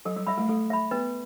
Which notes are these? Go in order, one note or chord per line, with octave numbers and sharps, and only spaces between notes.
F#3 A4
G3
G3 E5 B5
A3
A3 A4
E5 B5
B3 B4